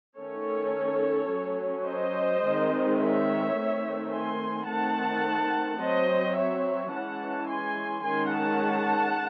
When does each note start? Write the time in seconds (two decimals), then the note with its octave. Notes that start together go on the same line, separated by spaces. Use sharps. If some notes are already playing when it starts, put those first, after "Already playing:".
0.17 D#3 A3 C#4 A4 C#5
1.29 F#3 C#4
1.86 C5 D#5
2.42 D#3 G#3 C4
2.98 C#5 E5
3.54 D#3 A3 C4
4.11 G#5 C6
4.67 D#3 A3 C4 F#5 A5
5.79 F#3 C4 C5 D#5
6.35 C#5 E5
6.91 E3 G#3 C#4 F#5 A5
7.47 G#5 C6
8.04 D#3 G#3 C#4 G#5 C6
8.32 F#5 A5